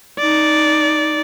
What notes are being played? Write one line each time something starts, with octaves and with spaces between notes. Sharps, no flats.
D#4 D5